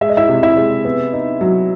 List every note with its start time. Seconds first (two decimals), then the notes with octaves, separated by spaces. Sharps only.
0.01 G#3 E5
0.09 D#5
0.17 E4 E5
0.29 C3
0.43 E4 E5
0.57 G#3
0.85 B3
1.13 D#4
1.41 F#3